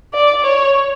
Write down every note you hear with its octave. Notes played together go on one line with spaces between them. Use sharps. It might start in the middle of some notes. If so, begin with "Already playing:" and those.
D5
C#5